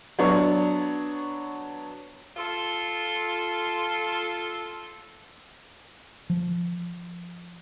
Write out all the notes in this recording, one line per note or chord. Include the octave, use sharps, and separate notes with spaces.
F#3 B3 D4 C#5
F4 A4
F3